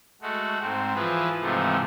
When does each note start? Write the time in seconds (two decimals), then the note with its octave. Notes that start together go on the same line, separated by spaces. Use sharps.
0.22 G#3 A3 F#4
0.61 G#2 C4
0.95 E3 F3 G#4 B4
1.41 G#2 C3 E3 F3 A3